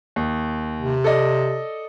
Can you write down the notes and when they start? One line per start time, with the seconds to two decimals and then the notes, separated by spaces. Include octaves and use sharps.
0.16 D#2
0.80 C3
1.04 A4 D5 D#5